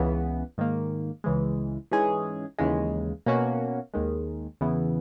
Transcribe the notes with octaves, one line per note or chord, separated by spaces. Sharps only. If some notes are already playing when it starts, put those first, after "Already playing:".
Already playing: C#2 C#3 E3 B3
G#2 D#3 A#3
C#2 C#3 E3 G#3
G#2 E3 G#3 C#4 G#4
D#2 C#3 E3 G#3
B2 A#3 C#4 F#4
D#2 D#3 G#3
E2 C#3 E3 B3 E4